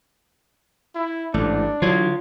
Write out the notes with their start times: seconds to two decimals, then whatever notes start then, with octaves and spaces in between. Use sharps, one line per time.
0.95 E4
1.34 A1 G#2 A3 D4
1.82 D3 E3 F#3 F4 C#5